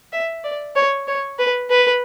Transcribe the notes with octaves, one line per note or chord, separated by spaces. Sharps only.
E5
D5
C#5
C#5
B4
B4